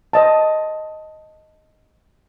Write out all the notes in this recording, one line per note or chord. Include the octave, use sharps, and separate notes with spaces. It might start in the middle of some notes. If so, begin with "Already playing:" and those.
C5 D#5 A5